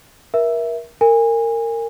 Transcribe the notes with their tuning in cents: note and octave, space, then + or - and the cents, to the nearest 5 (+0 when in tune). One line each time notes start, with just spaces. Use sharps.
A#4 +30 E5 +0
A#4 -25 G#5 -25